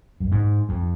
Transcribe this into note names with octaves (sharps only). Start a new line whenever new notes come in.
F#2
G#2
F2